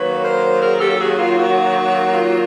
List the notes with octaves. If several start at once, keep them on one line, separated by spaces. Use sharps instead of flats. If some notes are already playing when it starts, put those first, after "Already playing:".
Already playing: D#3 F#3 A#3 B4 C#5
A#4 C5
G#4 A#4
G4 A4
A4
F#4 G#4
F4
F#4
F4